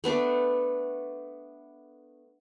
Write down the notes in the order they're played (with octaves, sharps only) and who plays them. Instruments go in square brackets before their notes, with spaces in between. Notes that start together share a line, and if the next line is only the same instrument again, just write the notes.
[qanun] A3 B3 D4 D6